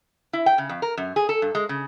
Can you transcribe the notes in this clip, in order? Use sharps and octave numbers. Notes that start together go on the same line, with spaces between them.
E4
G5
C#3
F2
A#4
F#2
G#4
A4
G2
G#3
C#3